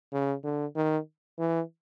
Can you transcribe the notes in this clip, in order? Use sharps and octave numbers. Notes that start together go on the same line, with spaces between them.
C#3
D3
D#3
E3